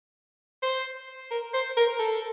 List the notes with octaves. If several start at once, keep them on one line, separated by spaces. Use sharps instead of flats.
C5
A#4
C5
A#4
A4